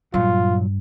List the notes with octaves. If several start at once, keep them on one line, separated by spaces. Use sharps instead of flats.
G2 A#2 F#3 F4